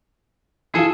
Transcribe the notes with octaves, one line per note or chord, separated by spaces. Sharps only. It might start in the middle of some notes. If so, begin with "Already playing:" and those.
E3 F4 G#4 A4